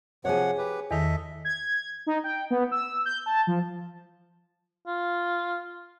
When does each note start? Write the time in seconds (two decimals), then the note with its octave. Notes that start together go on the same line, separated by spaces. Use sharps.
0.25 C3 F3 G#4 C#5 F#5
0.58 G4 B4
0.91 E2 D#3 A4 D#5 E5
1.45 G#6
2.07 D#4
2.24 G5
2.51 B3
2.72 E6
3.06 G6
3.26 A5
3.47 F3
4.87 F4